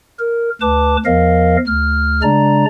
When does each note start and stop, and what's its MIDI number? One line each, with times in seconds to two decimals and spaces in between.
0.19 0.50 70
0.61 0.97 38
0.61 0.97 71
0.61 0.97 81
0.61 0.97 86
1.06 1.57 40
1.06 1.57 53
1.06 1.57 70
1.06 1.57 75
1.06 1.57 77
1.67 2.22 38
1.67 2.22 89
2.22 2.65 49
2.22 2.65 56
2.22 2.65 62
2.22 2.65 74
2.22 2.65 82